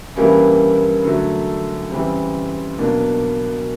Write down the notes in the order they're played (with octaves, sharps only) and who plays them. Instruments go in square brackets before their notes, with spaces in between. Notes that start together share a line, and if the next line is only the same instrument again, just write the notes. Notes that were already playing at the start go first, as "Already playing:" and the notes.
[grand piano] G2 E3 G3 A#3 C#4
D3 F#3 A3
C#3 E3 G3 C4
B2 F#3 A#3 D4